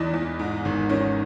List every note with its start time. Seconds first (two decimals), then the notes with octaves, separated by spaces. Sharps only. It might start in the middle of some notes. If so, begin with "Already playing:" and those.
Already playing: E2 E3 D#4
0.14 E2
0.39 G#2
0.65 G#1
0.89 D#3 C#4